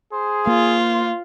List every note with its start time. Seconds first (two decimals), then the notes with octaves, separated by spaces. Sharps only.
0.13 G#4 C5
0.47 A#3 F4